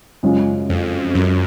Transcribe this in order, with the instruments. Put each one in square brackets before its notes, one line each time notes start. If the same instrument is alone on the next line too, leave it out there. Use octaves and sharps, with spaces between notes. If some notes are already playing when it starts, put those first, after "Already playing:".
[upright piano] F#2 C#3 G#3 C#4 F4
[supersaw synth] F2
F#2